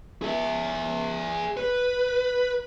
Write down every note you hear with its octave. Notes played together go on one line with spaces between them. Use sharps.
G#4 E5
B4